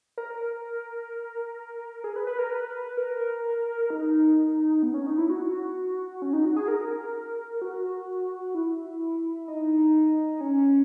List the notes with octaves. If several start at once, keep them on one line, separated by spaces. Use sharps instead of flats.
A#4
G#4
B4
B4
A#4
B4
A#4
D#4
B3
C#4
D#4
E4
F#4
C#4
D#4
F#4
G#4
A#4
F#4
E4
D#4
C#4